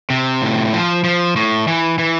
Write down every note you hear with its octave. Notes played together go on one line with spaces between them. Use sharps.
C3
A2
F3
F3
A2
E3
E3